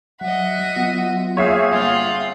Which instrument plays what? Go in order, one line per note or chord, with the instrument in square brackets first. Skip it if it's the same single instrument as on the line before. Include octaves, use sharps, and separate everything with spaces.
[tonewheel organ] F#3 [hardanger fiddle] D#5 E5 [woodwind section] F#5
[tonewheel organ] F#3 B3 F4
[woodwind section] A#3 C4 G#4 [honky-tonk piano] C#5 E5 F5 [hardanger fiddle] G#5
[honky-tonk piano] G1 [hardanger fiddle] F4 F#5 [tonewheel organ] E5